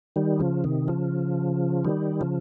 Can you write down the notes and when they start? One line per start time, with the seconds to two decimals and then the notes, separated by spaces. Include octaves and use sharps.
0.16 D#3 G3
0.39 C#3 F3
0.64 C3 D#3
0.88 C#3 F3
1.85 D#3 G3
2.21 C#3 F3